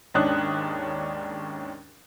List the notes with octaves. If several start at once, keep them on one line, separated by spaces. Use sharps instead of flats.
D#2 G#2 C#4 D4 D#6 F#6